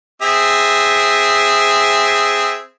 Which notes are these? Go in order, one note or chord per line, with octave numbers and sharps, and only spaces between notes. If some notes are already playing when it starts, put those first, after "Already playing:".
C4 G#4 E5